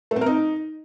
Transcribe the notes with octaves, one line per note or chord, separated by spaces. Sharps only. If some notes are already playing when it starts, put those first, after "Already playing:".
A3
C4
A#4
D#4